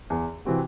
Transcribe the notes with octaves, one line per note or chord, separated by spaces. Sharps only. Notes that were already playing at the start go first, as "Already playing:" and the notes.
E2
C3 E3 C4 F#4